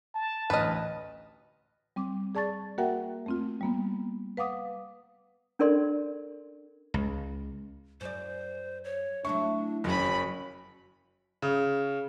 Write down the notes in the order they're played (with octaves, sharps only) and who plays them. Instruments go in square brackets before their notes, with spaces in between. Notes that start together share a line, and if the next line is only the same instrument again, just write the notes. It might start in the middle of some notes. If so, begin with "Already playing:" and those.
[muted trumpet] A5
[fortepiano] A1 D2 F6 [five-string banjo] B4 D#5
[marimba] G3 C4 D6
G#4 D5 A5 C#6 A6
A#3 F#4 A#4 E5 F#5 G5
A3 C4 F4
G3 A#3 B3
B4 F5 F#5 D6 D#6
[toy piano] C#4 D4 A4 A#4 D5 C6
[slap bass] C#2
[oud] F#2 D5 [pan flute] C5
[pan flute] C#5
[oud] F#3 A3 E4 [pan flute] D4 [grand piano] C#6
[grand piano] F#1 [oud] D#3 F3 C4 [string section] C#4 B5 [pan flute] F#4
[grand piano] C#3